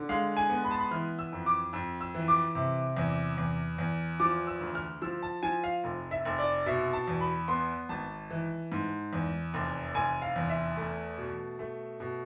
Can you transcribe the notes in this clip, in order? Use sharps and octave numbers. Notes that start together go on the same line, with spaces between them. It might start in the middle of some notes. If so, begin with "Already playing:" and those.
Already playing: D3
G#3 F5
G#5
B3
B5
A5
B5
E3 F6
E6
F2
D6
F2 E6
E6
E3
D6
C3
E2
E2
E2
F3 D6
E6
D2
F6
F3 E6
A5
F3 G#5
F5
F1
E5
F1
D5
B2 E5
A5
E2
B5
B3 C6
G#1 A5
E3
G#2
E2
F1
F1 G#5
F5
E2
E5
A3
B2
A3
B2